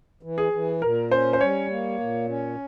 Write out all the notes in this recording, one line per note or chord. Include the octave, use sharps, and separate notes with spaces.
E3
G#4
E3
A#2 A#4
C#4 C5
C5
G3 C#5
A#3
A#2
C#4